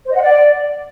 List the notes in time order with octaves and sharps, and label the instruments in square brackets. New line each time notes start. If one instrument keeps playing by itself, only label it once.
[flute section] C5
D#5
F#5
D5